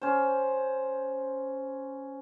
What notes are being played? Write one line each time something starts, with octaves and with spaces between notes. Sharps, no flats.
C#4 C5